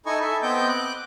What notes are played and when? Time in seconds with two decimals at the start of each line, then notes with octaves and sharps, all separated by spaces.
0.06 D#4 E4 A4 D#5 G#5 C#6
0.21 A4 E5
0.42 B3 C4 D#5 G5 D6 G6
0.69 D6 F#6